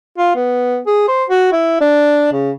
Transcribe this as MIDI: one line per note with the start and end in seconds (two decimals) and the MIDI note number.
0.18 0.33 65
0.35 0.79 59
0.87 1.08 68
1.08 1.25 72
1.30 1.49 66
1.52 1.79 64
1.81 2.32 62
2.33 2.51 49